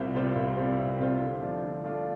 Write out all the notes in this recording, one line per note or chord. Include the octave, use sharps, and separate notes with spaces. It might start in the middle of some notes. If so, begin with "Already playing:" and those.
Already playing: C2 C3 G3 F4 C5
C3 G3 F4 C5
C2
C3 G3 F4 C5
C2
C3 G3 F4 C5
D3
F3 A3 D4 F4
D3
F3 A3 D4 F4